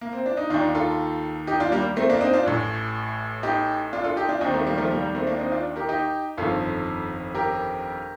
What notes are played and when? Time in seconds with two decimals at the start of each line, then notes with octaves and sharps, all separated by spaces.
0.01 A#3
0.13 C4
0.26 D4
0.37 D#4
0.50 D#2 D#3 D4 F4
0.75 F4 A4
1.47 D#4 G4
1.60 D4 F4
1.72 G3 A#3
1.96 A3 C4
2.09 A#3 D4
2.21 C4 D#4
2.33 D4 F4
2.46 A1 A2
3.43 D#4 G4
3.93 D4 F4
4.04 F4 A4
4.16 D#4 G4
4.29 D4 F4
4.41 D#2 D#3 C4 D#4
4.54 A3 C4
4.66 G3 A#3
4.78 F3 A3
4.91 G3 A#3
5.02 G3 A#3
5.15 A3 C4
5.27 A#3 D4
5.39 C4 D#4
5.52 D4 F4
5.76 G4 A#4
5.89 D#4 G4
6.37 G1 F2 D#3 F4 A4
7.34 G4 A#4